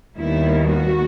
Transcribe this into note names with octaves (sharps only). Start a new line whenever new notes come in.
D#2 D#3 G3 B3 E4
F#4